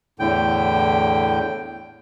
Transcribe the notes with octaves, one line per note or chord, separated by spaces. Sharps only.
E2 A2 D3 G5